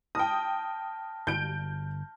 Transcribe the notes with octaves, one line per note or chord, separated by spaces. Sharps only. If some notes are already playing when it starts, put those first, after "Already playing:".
G5 A5 D#6 F6 A#6
G1 G6 D7